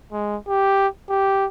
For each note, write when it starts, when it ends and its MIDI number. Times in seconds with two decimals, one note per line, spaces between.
0.12 0.37 56
0.48 0.88 67
1.09 1.46 67